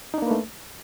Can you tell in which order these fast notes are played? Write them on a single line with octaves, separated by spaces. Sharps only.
D#4 D4 A#3 B4 A3